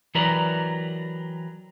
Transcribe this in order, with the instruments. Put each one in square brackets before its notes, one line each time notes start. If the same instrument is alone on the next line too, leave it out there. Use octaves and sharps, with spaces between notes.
[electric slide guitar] E3 F#3 G4 A#4 B4 D5